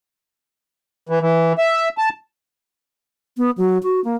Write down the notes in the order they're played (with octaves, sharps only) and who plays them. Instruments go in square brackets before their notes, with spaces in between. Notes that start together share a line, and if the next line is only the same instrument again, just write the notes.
[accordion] E3
E3
E5
A5
[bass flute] B3
F#3
F#4
A#3